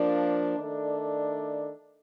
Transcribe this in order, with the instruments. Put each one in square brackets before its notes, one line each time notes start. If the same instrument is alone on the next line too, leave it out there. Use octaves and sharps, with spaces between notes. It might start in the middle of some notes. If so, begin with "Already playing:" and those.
Already playing: [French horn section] F3 A#3 D4
D#3 A3 D4 A4 D5